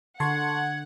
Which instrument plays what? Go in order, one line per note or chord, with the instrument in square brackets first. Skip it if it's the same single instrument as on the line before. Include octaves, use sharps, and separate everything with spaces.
[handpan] D3 [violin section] F#5 [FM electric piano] A5 C6 C#6 [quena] G#6